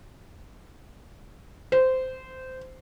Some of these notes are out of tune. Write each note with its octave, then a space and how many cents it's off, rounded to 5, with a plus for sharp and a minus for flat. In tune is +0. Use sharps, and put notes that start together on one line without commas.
C5 -15